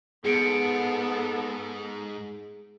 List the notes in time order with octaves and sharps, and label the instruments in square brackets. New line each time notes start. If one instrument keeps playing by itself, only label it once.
[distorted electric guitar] G#2 [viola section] B3 A4 [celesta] G#4 C#7 D7